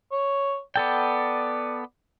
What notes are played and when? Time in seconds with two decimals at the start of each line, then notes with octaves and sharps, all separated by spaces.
0.12 C#5
0.76 B3 A4 D5 G5